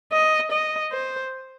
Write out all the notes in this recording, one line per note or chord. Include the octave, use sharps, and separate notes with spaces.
D#5
D#5
C5